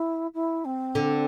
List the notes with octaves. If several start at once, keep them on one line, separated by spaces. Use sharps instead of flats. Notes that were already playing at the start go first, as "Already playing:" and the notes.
Already playing: E4
E4
C4
D3